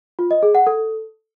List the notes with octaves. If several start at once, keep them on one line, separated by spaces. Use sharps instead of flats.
F4
D#5
G#4
F#5
A4